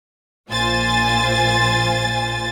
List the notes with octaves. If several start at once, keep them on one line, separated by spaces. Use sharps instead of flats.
A#1 A#2 F4 C5 G#5 A6